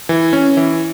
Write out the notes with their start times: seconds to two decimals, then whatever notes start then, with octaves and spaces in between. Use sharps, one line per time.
0.09 E3
0.33 C#4
0.57 E3